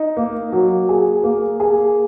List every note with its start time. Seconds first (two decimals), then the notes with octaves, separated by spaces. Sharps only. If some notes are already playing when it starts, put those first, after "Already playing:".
Already playing: D#4
0.17 A#3
0.52 F#3
0.89 G#4
1.24 A#3
1.60 G#4